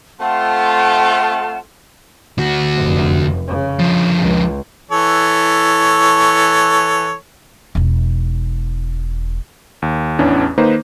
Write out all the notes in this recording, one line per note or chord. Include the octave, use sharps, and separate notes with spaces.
A3 C4 F4 F#5 A5 C6
D2 F#4
F1 F#2
C#3
D3 F3
C#2
E3 A4 C#5
E1 D#4
D#2
A1 E2 E3 C#4 D4
D#3 A#3 D#4 B4 C5